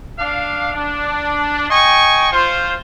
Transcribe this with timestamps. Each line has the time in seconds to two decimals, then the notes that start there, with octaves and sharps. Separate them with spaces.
0.18 D4 F5
0.74 D4
1.70 D#5 G5 G#5 C#6
2.32 F4 C5